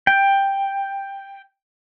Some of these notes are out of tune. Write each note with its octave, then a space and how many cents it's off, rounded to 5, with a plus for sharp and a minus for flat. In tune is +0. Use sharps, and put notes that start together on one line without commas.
G5 +10